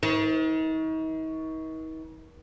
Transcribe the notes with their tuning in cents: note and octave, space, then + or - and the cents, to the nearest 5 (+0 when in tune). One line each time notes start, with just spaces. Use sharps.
D#3 +40